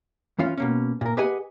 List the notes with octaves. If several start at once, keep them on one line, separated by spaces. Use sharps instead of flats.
E3 C#4 F4 F5
B2 A#3 C#4
A#2 A#4
G4 G#4 B4 D#5 F#5 G#5